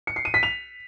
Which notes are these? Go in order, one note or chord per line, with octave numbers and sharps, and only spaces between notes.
C#7
C7
D#7
B6
F7